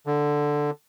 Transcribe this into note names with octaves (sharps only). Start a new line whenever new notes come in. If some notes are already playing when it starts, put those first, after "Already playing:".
D3